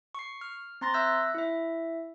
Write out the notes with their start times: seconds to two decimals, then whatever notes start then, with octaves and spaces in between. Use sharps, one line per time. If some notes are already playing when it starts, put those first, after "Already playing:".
0.15 C#6 C7
0.41 F6
0.81 C4 A#5 C6 A6 A#6
0.94 E5 E6 F#6 G6 A#6
1.34 E4 E5